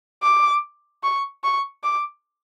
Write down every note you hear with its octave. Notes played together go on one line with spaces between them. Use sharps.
D6
C#6
C#6
D6